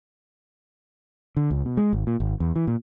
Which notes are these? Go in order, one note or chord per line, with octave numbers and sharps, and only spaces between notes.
D3
C#2
B2
G#3
G#1
A#2
G#1
E2
E3
A#2